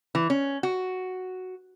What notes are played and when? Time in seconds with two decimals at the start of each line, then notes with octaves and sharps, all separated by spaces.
0.15 E3
0.30 C#4
0.63 F#4